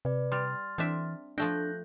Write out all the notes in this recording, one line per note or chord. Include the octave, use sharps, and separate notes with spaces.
C3 B4 D5
G3 C6 F6 A6
E3 C4 D4 E5
F3 A3 D4 G5 F#6 G6 A#6